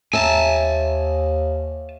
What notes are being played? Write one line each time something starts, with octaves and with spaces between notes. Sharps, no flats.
D#2 E5 G#5 A5